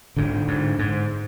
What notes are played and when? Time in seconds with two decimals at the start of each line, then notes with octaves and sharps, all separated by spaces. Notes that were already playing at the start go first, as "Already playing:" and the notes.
0.17 G#2 D3
0.48 G#2
0.79 G#2